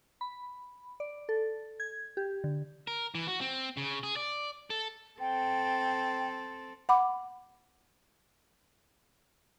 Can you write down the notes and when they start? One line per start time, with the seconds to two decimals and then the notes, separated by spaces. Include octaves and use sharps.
0.21 B5
1.00 D5
1.29 A4
1.80 G#6
2.17 G4
2.44 D3
2.87 A#4
3.15 E3
3.27 F#4
3.41 C4
3.77 C#3
4.03 G#4
4.16 D5
4.70 A4
5.20 C4 A4 G5
6.89 F#5 B5 D6